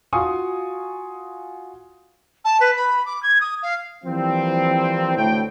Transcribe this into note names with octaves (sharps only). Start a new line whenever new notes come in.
F4 F#4 G#5 C6 C#6 D#6
A5
B4
B5
D6
G#6
D#6
F5
E3 F3 G3 A#3 C4
D2 A2 G5